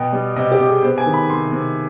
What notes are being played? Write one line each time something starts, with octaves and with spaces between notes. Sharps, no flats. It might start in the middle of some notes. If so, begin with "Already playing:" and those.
Already playing: B2 B3 G5
G3
C3 D#5
G4
C3
G#4
B3 C5
G#5
D#3
B5
C3 C6
C3